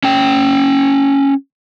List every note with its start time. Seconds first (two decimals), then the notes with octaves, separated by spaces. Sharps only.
0.04 C#4 G5